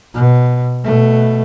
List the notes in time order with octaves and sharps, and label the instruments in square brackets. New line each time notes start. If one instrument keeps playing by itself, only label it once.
[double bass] B2
B2 A3